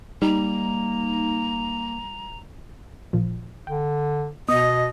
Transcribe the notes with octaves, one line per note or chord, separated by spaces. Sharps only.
G3 A#3 D#4 A#5
A1 A#2 F3
D3 G5
B2 B3 D#5 D#6